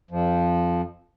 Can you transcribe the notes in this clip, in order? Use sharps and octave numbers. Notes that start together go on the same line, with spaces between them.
F2 F3